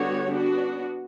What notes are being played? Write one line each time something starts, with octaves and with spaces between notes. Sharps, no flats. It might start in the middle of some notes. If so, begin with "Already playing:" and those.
Already playing: D3 G3 B3 F#4 C#5
B3 D4 F#4